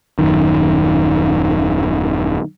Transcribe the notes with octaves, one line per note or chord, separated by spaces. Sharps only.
D#1 F#2 D#3